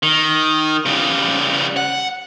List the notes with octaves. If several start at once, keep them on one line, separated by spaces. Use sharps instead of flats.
D#3
C#3 G3
F#5